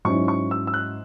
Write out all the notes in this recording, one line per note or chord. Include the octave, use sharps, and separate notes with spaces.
G#2 F#3 C#4 E4 C#6
C#6
E6
E6
F#6